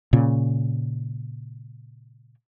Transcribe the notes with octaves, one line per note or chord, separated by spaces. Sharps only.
A#2 C#3